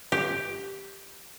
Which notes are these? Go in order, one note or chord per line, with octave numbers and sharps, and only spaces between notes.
G4